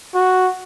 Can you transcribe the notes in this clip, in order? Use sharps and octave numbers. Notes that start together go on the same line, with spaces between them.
F#4